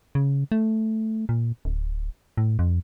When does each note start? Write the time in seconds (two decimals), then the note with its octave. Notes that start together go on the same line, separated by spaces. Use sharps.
0.15 C#3
0.52 A3
1.29 A#2
1.65 D1
2.37 A2
2.59 F2